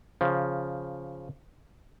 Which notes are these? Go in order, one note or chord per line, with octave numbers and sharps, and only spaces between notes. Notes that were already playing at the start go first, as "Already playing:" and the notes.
C#3 F3